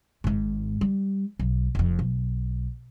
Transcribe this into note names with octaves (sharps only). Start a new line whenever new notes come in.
G#1 G#2
G3
B1
F1 F2
B1